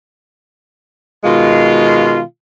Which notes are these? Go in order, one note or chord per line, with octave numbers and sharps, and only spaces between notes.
B2 D#3 G#3 F4